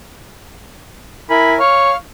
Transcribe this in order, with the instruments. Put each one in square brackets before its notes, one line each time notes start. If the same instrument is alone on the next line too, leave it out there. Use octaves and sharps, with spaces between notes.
[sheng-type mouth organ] E4 A#4 G#5 [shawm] B5
[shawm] C#5 [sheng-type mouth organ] F5 C#6 F6